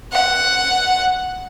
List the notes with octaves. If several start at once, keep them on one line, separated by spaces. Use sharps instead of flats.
F#5